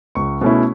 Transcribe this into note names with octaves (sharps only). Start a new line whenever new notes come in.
C#2 C#6
B2 A3 C#4 E4